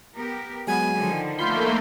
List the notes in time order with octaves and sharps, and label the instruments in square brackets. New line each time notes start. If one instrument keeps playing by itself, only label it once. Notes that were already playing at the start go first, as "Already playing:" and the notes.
[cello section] B3 G4 A#4
[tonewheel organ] F#3 G#3 [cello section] B3 [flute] G#5
[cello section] D3 D#3 F3
[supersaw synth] A3 A#3 [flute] F4 [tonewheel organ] B5 C6 G6